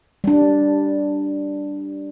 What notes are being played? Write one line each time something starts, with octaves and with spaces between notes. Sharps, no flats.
G3 D4